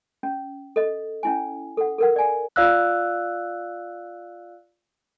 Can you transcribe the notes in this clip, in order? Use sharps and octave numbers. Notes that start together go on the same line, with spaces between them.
C#4
A4 D#5
C#4 E4 G#5
A4 F#5
A4 A#4 F#5
D5 G#5
F4 D5 F5 E6 F#6